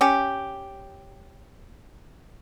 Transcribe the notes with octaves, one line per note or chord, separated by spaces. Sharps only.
C#4 G4